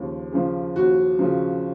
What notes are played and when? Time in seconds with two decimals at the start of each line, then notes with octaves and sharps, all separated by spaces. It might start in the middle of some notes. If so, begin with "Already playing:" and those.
Already playing: D#2 C#3 F3
0.32 C#3 F3
0.75 D#2 F#4
1.19 C#3 F3